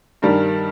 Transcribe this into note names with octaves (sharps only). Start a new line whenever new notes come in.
G2 D#3 G3 A#4